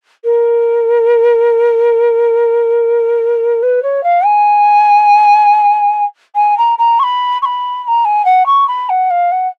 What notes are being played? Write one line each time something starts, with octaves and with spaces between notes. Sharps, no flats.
A#4
B4
C#5
F5
G#5
G#5
A#5
A#5
C#6
B5
C#6
B5
B5
A#5
G#5
F#5
C#6
B5
F#5
F5
F#5